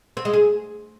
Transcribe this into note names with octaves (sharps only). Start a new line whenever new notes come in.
C4
G#3
G#4